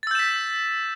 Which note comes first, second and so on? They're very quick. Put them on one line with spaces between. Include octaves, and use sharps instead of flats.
A6 E6 G6 E7 B6